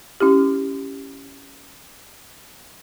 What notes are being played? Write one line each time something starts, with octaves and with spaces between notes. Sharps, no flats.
C#4 E4 G4